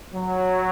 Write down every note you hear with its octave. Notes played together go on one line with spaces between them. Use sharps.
F#3